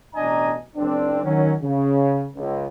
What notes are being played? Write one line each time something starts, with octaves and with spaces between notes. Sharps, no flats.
A1 B2 D4 D#5 G#5 A#5
F#1 C4 D4
D#3 F#3 C#4
C#3
C#2